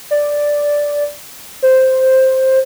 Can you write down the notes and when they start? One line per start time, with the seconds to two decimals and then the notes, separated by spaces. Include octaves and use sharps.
0.11 D5
1.62 C5